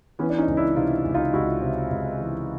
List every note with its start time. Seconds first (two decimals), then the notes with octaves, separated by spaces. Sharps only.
0.19 E3 B3 C#4
0.29 D4
0.38 C#4 D#4
0.48 C#2
0.57 D4 E4
0.76 C3 D#4 F4
1.05 C#2
1.14 D#4 F4
1.34 C#2 E4 F#4
1.62 C3
1.91 C#2
2.19 E3